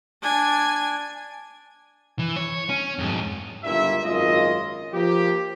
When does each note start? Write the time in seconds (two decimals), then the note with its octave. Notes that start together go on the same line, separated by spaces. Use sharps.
0.22 D4 G#5
2.19 E3
2.36 C#5
2.69 C#4
2.99 F2 G#2
3.63 G1 C#2 G2 A#2 E4 E5
4.04 G#1 F#2 C#3 G#3 F4 D#5
4.94 F3 A#3 G4